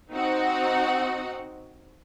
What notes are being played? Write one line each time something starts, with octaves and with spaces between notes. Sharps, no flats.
C4 D#4 F#4 F#5